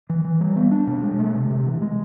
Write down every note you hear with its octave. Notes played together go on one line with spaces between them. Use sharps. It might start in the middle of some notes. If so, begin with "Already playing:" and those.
E3
E3
G3
B3
D4
B2
G#3
A3
C3
C3
E3
G#3